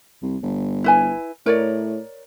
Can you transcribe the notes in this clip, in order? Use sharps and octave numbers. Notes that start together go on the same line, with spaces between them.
C2
G1
E4 B4 G#5
A2 A#4 C#5 D5